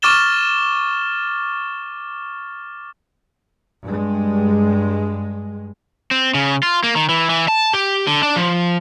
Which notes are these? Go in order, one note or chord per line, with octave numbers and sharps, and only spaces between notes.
C#6 D6 F6 A6 E7 G7
G2 G#3
C4
C#3
F4
A#3
D#3
E3
E3
A5
G4
D3
D4
F3